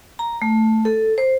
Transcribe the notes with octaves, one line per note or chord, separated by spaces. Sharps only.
A#5
A3
A4
C5